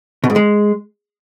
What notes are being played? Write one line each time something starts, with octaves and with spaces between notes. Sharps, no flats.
B2
G#2
G#3